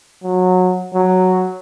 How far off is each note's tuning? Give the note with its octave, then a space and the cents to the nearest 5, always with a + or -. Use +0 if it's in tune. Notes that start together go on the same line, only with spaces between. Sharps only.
F#3 -20
F#3 +0